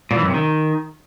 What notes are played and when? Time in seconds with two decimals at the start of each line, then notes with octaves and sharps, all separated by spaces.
0.11 A#2
0.16 E3
0.22 F#2
0.28 C3
0.34 D#3